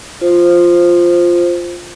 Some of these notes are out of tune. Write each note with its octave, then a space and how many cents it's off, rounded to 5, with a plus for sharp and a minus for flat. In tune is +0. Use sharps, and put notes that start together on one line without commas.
F4 +0 C5 +0